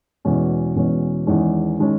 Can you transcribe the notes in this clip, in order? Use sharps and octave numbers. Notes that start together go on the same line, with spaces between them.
E2 B2 G#3 C#4
E2 B2 G#3 C#4
E2 D#3 G#3 C#4
D#3 G#3 C#4